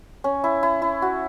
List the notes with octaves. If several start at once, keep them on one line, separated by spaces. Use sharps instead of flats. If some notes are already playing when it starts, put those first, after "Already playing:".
C#4
E4
E4
E4
F#4